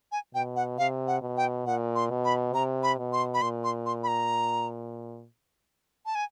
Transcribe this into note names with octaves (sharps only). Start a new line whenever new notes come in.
G#5
B2 G5
F#5
C3 F5
F#5
B2
G5
A#2 F#5
C6
B2
B5
C3 A#5
B5
B2
C6
B5
A#2 C6
C6
C6
B5
A#5
A5
G#5